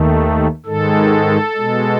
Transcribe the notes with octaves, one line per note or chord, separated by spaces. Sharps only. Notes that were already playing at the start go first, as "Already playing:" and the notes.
Already playing: D#2 D#3 A3
G#2 D#3 G#3 A4
B2 G#3